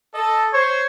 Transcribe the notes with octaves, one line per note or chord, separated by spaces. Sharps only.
A4 D#5
C5 C#5